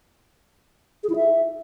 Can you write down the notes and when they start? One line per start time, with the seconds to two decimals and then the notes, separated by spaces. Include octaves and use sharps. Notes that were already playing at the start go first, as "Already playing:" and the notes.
1.04 G#4
1.10 E4
1.16 E5